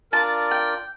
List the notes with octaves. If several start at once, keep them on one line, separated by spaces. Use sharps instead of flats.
D4 F4 A#4 D5 A5
G5